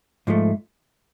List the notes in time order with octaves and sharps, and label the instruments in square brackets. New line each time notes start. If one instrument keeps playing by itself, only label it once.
[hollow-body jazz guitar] G#2 F3 A3